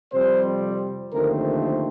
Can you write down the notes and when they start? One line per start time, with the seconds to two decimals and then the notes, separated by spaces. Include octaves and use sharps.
0.13 F2 C3 G3 C4 C5
1.13 D#2 D3 F3 A3 C4 A#4